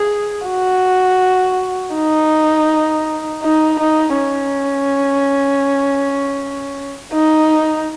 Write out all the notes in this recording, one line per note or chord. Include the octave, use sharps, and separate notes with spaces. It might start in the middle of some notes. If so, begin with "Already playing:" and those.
Already playing: G#4
F#4
D#4
D#4
D#4
C#4
D#4